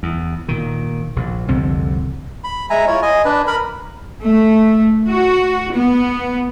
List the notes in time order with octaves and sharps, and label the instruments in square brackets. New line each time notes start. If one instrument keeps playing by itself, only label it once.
[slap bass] E2
A#2 D#3
A#1
C2 F2 D3 C4
[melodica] B5
G#3 E5 G#5 A#5
E4 F4 C#5
D#5 G#5
D4 B4
A#4 B5
[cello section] A3
F#4
B3